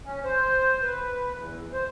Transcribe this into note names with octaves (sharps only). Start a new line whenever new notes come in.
C#4
C5
B4
E2
C5